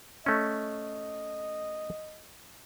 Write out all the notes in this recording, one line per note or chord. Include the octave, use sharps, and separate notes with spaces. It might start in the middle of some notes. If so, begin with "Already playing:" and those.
A3 C#4 D#5